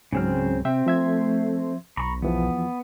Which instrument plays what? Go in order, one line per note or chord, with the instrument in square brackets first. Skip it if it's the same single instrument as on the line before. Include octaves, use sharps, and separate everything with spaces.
[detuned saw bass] C#2 [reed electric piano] G#2 F#3 [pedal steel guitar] C#3 C4 F6
[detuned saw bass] C3 [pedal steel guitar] C4 [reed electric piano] E5 G5
[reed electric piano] F3 E5 G#6 [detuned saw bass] A3
[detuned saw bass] B1 [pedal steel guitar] A#5 B5 C#6
[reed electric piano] E2 E3 F3 [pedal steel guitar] B3